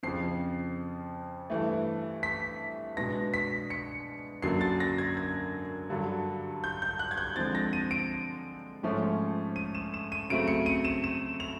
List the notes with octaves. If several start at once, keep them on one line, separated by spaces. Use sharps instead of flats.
F2 C#3 F3 C7
G2 E3 A3
B6
B2 G#3 B3 D4 A#6
B6
C#7
F#2 D3 F#3 A#3 D4 C7
A6
A#6
G#6
G#6
G2 D3 F#3
G6
G6
F#6
G#6
G6
D3 F3 G#3 C4 A6
A#6
D#7
D7
G#2 F3 A3 C#4
D#7
E7
E7
D#7
C#3 F#3 A3 C4 D7
C#7
D#7
E7
E7
F7